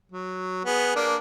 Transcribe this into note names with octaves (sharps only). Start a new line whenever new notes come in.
F#3
B3 G#4
A#3 D4